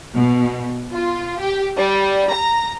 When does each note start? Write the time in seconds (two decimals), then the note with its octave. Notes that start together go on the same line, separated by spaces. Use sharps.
0.13 B2
0.92 F4
1.40 G4
1.77 G3
2.32 A#5